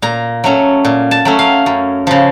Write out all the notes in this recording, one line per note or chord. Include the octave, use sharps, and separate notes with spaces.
A#2 A#5
F#3 A3 C#4
A#2
A5
F#3 A3 C#4
F5
F#2
C#3 F3